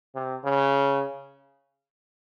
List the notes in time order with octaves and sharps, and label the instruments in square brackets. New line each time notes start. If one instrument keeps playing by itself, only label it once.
[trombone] C3
C#3